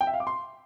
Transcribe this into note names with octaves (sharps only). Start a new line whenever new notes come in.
G5
E5
F5
D6
C6